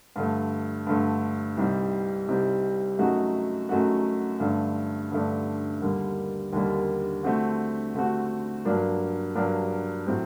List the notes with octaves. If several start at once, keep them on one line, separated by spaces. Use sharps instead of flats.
G2 D3 A3
G2 D3 A3
C2 C3 G3 C4 D#4
C2 C3 G3 C4 D#4
F#2 F#3 A3 D#4 F#4
F#2 F#3 A3 D#4 F#4
G2 D3 A3 D4
G2 D3 A3 D4
D#2 D3 G3 A#3
D#2 D3 G3 A#3
D3 A3 C4 F#4
D3 A3 C4 F#4
G2 F#3 A#3 D4
G2 F#3 A#3 D4
A2 F#3 C4